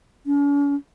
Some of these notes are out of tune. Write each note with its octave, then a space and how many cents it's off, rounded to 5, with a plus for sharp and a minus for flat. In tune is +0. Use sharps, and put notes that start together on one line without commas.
C#4 +45